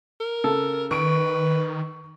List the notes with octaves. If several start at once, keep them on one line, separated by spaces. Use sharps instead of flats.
A#4
C#3 A4
D#3 B4 C#6 D7